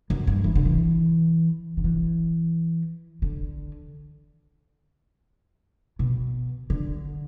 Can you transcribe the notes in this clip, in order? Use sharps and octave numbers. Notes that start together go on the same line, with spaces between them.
F#2
G2
E3
D3
E3
D3
E3
D3
B2
D3